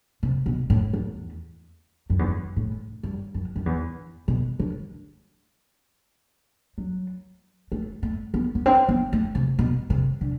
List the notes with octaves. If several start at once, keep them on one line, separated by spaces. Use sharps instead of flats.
C3
B2
A2
E2
F#2
E2
F#2
A2
G2
F#2
F#2
E2
B2
D3
F#3
A3
A3
B3
B3
C4
B3
A3
C3
B2
C3
D3